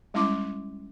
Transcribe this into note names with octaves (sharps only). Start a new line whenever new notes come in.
G3 G#3 C#4 E4 C6 D6